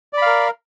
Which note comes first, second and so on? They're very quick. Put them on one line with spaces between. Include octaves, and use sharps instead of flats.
D5 B5 F5 A#4